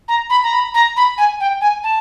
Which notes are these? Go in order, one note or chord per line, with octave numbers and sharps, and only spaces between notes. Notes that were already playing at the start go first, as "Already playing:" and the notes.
A#5
B5
A#5
B5
A#5
B5
G#5
G5
G#5
A5